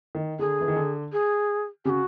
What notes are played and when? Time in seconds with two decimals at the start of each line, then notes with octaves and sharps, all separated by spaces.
0.15 D#3
0.39 D3 G#4
0.61 E3
0.68 D#3
0.76 D3
1.13 G#4
1.85 C#3 F#4 G4